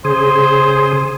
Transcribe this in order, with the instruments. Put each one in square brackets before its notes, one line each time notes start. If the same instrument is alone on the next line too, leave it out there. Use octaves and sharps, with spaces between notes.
[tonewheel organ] C#3 G#4 [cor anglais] C5